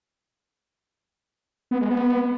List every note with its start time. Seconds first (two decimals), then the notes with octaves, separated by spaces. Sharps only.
1.71 B3
1.81 G#3
1.90 B3